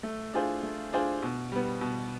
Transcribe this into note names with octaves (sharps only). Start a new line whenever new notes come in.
A3
D4 F4 G#4 C5
A3
D4 F4 G#4 C5
B2
G3 B3
B2